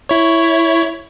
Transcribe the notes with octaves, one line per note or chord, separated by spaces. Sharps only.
E4 C#5